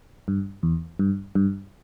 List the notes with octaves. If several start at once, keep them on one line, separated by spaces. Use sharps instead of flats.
G2
E2
G2
G2